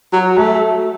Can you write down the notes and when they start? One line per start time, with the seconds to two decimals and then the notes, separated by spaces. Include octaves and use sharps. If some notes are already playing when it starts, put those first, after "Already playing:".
0.13 F#3
0.38 A3